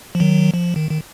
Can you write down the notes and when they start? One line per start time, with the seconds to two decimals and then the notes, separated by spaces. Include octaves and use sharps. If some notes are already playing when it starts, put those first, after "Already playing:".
0.15 F3
0.20 D#3 F#3
0.54 F3
0.76 D#3
0.91 D#3